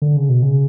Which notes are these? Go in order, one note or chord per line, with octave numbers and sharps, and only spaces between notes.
D3
C#3
B2
C#3